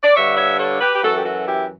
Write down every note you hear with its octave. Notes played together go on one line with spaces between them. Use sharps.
D5
G2 D3 C#5 E5
C#5 E5
A4 C#5
G4 B4
G4
F#2 E3 F#4 A4
G4
F#4 A4
E4 G4